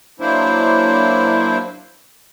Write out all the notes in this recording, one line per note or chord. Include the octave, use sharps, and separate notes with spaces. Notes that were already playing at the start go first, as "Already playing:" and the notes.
F#3 A#3 D4 E4 C5